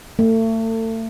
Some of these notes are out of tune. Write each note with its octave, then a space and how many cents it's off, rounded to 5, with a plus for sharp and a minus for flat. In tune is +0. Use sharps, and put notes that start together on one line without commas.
A3 +35